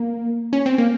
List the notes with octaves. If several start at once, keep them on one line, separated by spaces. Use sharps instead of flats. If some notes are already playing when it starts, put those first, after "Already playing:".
Already playing: A#3
C#4
C4
A#3